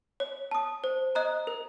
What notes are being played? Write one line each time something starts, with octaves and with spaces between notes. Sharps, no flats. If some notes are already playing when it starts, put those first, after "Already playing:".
C#5
A5 D#6
C5
D#5 A#5 D#6 F#6
A#4